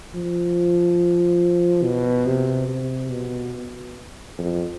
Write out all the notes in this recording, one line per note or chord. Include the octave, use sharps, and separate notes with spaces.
F3
B2
C3
C3
B2
F2